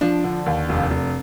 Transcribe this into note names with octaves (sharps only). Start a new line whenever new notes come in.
F3 D4
D3
D#2
F1
F1